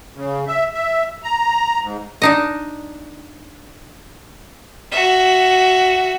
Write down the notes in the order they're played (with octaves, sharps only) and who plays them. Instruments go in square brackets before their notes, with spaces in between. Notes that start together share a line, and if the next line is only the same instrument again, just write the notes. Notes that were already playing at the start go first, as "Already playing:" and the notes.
[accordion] C#3
E5
E5
A#5
G#2
[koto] D4 D#4 D#5
[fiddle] F#4 E5